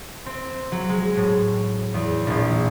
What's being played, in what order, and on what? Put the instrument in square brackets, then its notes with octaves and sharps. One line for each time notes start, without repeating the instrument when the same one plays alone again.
[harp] C4
F#3
G#3
A2
E2
A#1